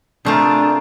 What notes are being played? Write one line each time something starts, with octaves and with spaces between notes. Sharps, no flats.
C3 A3 D4 F4 G#4 A#4 C5